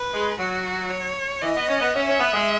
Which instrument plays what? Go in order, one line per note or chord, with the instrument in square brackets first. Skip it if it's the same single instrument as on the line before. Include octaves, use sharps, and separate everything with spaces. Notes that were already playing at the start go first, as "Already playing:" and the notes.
Already playing: [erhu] B4
[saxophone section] G#3
[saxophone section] F#3 [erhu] F#4
[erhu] C#5
[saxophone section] E3 [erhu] D#5
[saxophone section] B3
C#4
B3
[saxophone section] C#4 [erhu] E5
[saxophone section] C#4
B3
G#3